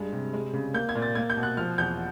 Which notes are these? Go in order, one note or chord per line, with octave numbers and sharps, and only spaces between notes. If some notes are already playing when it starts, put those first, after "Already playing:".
Already playing: G2 G#3
C3
G#3
C#3
A#3 G6
G#6
A#2
A6
A#3 G#6
G6
B2
F#6
F3 F6
E2 G6